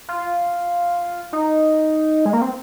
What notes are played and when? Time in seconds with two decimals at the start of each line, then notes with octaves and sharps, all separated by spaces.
0.09 F4
1.33 D#4
2.25 G#3
2.33 A#3
2.42 C4